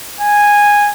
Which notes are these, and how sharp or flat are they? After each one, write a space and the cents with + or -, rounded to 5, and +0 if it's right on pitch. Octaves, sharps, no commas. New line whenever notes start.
G#5 -10